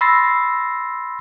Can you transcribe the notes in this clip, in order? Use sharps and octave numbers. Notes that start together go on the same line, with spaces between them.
B5 C6 E6 A6 A#6 C7